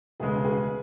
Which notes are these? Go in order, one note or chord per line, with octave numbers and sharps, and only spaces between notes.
E1 D2 C#3 G#3 G#4 B4
G#4 B4